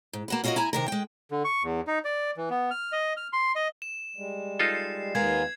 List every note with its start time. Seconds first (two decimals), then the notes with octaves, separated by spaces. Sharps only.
0.13 G#2
0.28 A#3 F#4 B4
0.44 C#4 F4 F#4 A4 A#4 D#5
0.56 E4 G#5 A#5
0.73 C3 D#3 A#4
0.88 G#3 G5
1.31 D3
1.45 C#6
1.63 E2
1.88 D#4
2.05 D5
2.37 E3
2.50 B3
2.71 F6
2.92 D#5
3.17 F6
3.33 C6
3.56 D#5
3.82 E7
4.16 G3 G#3
4.59 D#4 F4 A4 C7
5.15 D#2 G#3 B3 A#4 F5 G#6 C7